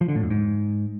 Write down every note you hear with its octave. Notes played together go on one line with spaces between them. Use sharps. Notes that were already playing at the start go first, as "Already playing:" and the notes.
F3
D3
A2
F2
G#2